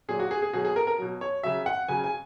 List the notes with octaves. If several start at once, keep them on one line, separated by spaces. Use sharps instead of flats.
A#2 F#3 G#4
F#4
G#4
G#4
B2 F#3 G#4
G#4
A#4
A#4
B2 F#3
C#5
C#3 F#3 E5
F#5
C#3 F#3 G#5
G#5